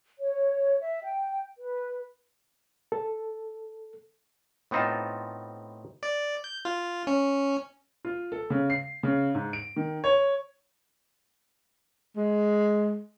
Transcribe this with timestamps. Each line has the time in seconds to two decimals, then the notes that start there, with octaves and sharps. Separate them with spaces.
0.20 C#5
0.81 E5
1.03 G5
1.58 B4
2.92 A4
4.71 A2 B3 C4 D#4 F4 A5
6.03 D5
6.44 G6
6.65 F4
7.07 C#4
8.05 F4
8.32 A4
8.50 C#3
8.70 C7
9.03 C#3
9.35 G#2
9.53 D7
9.76 D#3
10.04 C#5
12.16 G#3